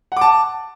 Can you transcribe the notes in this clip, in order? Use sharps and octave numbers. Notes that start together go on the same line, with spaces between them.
F#5 A5 D6